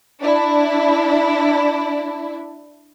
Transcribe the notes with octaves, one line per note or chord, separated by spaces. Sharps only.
D4 E4